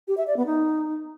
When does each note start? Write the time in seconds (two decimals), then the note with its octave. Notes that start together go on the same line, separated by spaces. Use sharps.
0.08 G4
0.17 E5
0.27 D5
0.37 B3
0.46 D#4